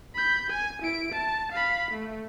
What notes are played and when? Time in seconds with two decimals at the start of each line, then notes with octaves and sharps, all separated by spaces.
0.15 B5 G6
0.50 G#5
0.82 E4 D7
1.12 A5
1.52 F5 B5
1.91 A3